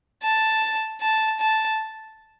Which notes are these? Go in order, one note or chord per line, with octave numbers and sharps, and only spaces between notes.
A5
A5
A5